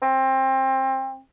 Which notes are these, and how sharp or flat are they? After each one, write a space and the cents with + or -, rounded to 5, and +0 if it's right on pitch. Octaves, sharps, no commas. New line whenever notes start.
C4 +25